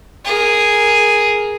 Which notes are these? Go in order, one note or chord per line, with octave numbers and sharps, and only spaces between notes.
G#4 A#4